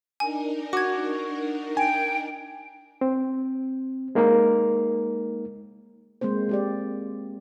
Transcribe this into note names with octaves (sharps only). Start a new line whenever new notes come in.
D4 D#4 A#4 G#5
F#4 D6 G#6
G5 G#5
C4
G#3 A#3 D#4 A#4
G#3 A#3 C4 C5
C4 G4 D5